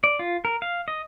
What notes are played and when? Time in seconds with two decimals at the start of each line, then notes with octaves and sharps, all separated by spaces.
0.04 D5
0.19 F4
0.45 A#4
0.62 F5
0.88 D#5